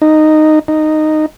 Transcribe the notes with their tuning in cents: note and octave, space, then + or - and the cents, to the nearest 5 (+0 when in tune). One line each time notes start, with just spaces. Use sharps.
D#4 -10
D#4 -10